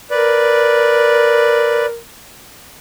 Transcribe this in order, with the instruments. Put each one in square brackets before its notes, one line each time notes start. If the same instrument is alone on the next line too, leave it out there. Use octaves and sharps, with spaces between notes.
[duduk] A#4 [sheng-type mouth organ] B4 D5